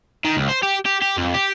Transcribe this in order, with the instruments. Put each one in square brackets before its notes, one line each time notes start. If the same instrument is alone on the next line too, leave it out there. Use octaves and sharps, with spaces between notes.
[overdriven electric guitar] D#3
C#2
C5
G4
G4
G4
F2
G4